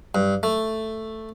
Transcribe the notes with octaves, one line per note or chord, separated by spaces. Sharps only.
G2
A3